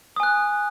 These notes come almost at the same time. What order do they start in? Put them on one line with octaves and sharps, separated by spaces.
D#6 G#5 F#6